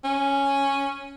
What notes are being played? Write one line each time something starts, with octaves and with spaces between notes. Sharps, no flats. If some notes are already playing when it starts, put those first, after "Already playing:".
C#4